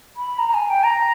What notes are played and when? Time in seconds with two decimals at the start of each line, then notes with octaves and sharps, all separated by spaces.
0.17 B5
0.38 A#5
0.49 A#5
0.54 G#5
0.69 G5
0.83 A#5